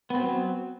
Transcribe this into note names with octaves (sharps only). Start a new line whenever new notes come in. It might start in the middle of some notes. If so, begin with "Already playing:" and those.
F#3 B3 C4